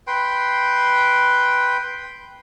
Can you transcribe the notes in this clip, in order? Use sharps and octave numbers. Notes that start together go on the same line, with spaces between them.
B4 G5 C6